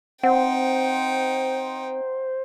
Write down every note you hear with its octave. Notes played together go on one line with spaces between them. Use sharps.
C4 D#4 C5 F#5 G5